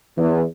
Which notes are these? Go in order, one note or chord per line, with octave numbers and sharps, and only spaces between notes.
E2